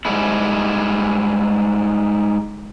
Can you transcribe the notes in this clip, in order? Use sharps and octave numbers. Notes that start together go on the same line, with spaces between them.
G#2 G3 G#3 E4